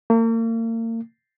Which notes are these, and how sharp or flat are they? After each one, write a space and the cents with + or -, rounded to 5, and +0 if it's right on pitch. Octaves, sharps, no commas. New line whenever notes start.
A#3 -40